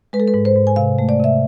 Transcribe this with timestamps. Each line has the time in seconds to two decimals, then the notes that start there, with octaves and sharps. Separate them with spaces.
0.13 G#3 B4
0.20 A4
0.28 B4
0.34 G#2
0.45 C5
0.56 G#2
0.67 G#5
0.76 C3 F5
0.99 A3
1.09 D5
1.19 C3 E5